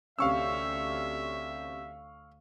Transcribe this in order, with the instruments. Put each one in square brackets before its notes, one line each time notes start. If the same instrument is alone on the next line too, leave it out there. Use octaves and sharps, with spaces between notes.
[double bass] D2 [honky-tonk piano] C3 C4 C#4 [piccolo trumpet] E5 [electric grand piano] F5 C#6 E6